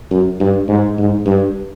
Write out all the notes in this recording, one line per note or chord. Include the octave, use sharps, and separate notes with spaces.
F#2
G2
G#2
G#2
G2